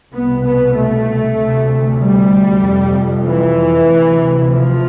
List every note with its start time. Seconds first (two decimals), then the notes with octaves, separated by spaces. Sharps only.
0.14 C2 B2 B3
0.46 B3
0.76 A3
1.39 D2 C3
2.01 G3
2.64 F2 C3
3.25 E3
3.88 D2 C3
4.50 F3